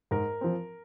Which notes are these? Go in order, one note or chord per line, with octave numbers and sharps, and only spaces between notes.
G#2 A#4
F3 C4